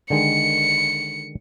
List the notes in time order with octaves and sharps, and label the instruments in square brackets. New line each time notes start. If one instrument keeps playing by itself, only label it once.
[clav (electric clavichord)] D3 D#3 G#3 [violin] C#7